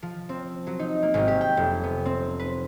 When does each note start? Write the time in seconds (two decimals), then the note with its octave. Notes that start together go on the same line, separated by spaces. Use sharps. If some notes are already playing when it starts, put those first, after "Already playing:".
0.02 F3
0.29 C4
0.67 F#3
0.79 D#4
1.03 A#3
1.14 G#1
1.28 G4
1.41 G5
1.57 F1
1.84 B3
2.06 C4
2.40 B4